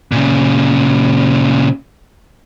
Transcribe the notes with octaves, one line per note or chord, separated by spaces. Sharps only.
A#2 C#3